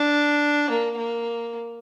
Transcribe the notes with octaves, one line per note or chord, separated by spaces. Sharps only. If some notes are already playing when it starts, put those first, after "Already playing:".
Already playing: D4
A#3
A#3